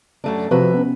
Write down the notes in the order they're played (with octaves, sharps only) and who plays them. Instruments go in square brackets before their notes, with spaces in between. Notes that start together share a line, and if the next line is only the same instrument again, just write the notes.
[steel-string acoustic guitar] F#2 A3 D4
[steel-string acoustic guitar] C3 B4 E5 [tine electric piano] F3 F#4
[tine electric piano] B3 C#4